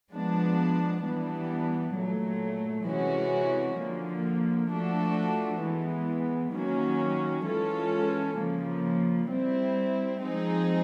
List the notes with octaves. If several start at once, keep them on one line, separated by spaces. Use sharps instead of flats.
F3 G#3 B3 D4
E3 G3 B3 D4
A#2 F#3 A3
C3 E3 G#3 C#4 F#4
D3 F3 A#3
F3 A3 D4 F#4 A4
E3 G#3 B3
D#3 F#3 A#3 C#4 F#4
E3 G#3 C#4 F4 A4
C#3 F3 A#3
G3 C4 E4
F3 G#3 C4 D#4 G#4